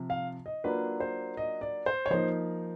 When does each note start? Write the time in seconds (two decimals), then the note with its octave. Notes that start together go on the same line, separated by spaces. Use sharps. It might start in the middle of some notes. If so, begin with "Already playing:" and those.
Already playing: C3 F3
0.10 F5
0.46 D#5
0.64 F#3 A#3 D4 F4 B4
1.00 C5
1.37 D#5
1.61 D5
1.86 C5
2.06 C#5
2.11 F3 A#3 D#4 C5